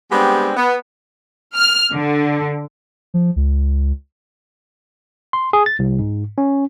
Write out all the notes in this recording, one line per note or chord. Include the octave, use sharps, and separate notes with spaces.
G3 G#3 B3 C4 D4 G4
B3
F6
D3
F3
C#2
C6
G#4
A6
C2
G#2
C#4